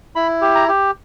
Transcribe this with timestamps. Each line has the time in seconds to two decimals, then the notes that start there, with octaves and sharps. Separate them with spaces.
0.15 E4 B5
0.41 G4
0.55 A#5
0.68 G4